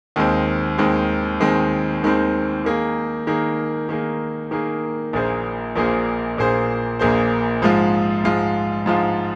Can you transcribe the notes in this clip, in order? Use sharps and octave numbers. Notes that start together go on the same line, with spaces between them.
D#2 D#3 G#3 C4
D#2 D#3 G#3 C4
D#2 D#3 G#3 C4
D#2 D#3 G#3 C4
D#3 A#3 G#4
D#3 A#3 G#4
D#3 A#3 G#4
D#3 A#3 G#4
A#1 A#2 A#3 G#4 C5
A#1 A#2 A#3 G#4 C5
A#1 A#2 A#3 G#4 C5
A#1 A#2 A#3 G#4 C5
G#2 F3 G#3 F4
G#2 F3 G#3 F4
G#2 F3 G#3 F4